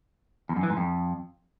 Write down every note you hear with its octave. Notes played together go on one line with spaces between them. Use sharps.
E2
F#2
E3
G#2
F2